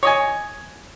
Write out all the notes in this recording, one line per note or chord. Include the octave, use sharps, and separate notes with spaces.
C#5 D#5 G#5